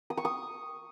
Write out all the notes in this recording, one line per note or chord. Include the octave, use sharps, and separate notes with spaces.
D#6
C#6
D#6